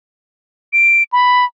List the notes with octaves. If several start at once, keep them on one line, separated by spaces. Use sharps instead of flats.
D7
B5